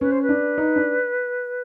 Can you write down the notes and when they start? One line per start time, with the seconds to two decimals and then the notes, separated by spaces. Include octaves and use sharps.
0.01 C#4 B4
0.11 C5
0.22 B4
0.29 D4
0.58 D#4
0.76 D4